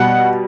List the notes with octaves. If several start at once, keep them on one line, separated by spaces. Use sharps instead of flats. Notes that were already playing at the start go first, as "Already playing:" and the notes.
Already playing: B2 G3 F#5